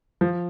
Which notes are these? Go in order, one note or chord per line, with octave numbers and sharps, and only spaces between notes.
F3